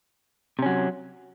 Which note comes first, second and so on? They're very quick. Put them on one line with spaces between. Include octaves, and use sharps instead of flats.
C3 C#4 F#3